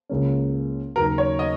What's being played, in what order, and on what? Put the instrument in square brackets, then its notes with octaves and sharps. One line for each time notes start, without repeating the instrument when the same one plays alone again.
[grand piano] C#2 C#3 A#3 C#4
[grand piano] D#2 C#3 F#3 [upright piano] A#4
[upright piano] C#5
D#5